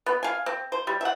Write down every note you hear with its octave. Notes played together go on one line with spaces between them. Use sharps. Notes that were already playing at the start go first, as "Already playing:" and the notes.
B3
F5 G#5
C4
C5
G3
E5 F#5